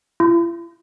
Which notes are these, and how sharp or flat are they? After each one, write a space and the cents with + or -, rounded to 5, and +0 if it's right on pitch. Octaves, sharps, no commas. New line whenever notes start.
E4 +45